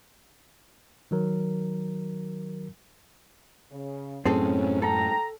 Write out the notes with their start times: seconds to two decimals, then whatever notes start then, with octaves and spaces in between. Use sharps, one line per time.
1.11 D#3 F#3 A#4
3.71 C#3
4.25 F#2 A2 C4 C#4 G#4 A4
4.82 A4 G5 A#5